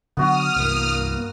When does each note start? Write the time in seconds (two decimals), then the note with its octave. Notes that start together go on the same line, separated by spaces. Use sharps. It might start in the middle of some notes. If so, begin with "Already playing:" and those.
0.17 D3 F#3 B3 D4 F#4 D#6 F6
0.56 C2 G2 E3 A#3